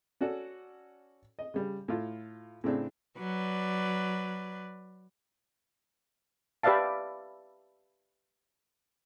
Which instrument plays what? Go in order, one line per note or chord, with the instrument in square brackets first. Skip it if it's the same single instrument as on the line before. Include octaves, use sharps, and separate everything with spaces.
[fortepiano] C#4 F#4 A4 D5
D#5
C#3 G3
A2 F4
A2 C#3 C4 D4
[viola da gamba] F#3 B4 D5
[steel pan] G4 B4 D5 E5 F5 A5